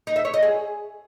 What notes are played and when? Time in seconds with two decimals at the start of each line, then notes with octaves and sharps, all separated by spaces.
0.07 D#4
0.16 E5
0.25 C#5
0.34 D#5
0.42 G#4